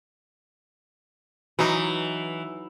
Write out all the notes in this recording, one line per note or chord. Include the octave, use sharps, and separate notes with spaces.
E3 F#3 D#4